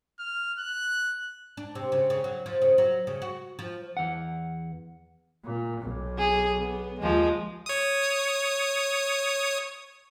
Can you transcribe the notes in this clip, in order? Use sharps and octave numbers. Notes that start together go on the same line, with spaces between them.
F6
F#6
D4
C3
C#3
C#3
F#3
F3
C#3
F#3
C#3
F#4
F3
E2 F#5
A#2
B1
G#4
B3
D#2 F3 G#3
C#5 D#6